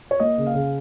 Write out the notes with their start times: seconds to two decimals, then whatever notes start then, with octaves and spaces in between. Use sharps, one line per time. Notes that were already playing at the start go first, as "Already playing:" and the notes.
0.11 C#5
0.20 A#3 D#5
0.38 C#3
0.47 F5
0.54 C#3